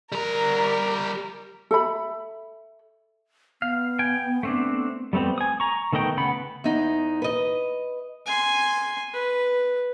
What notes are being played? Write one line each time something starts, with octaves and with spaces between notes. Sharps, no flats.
G3 A#4 A#5
A4 E5 B5
B3 F5
G5 G#5
A3 C4 D4
G3 A3 B3 C4
G#5 D#6
A#5 C#6
D#3 A3 B3 D#5 G5
C#3 B3 F#5 B5
E2 D#4
B4 D#5
G#5 C6
B4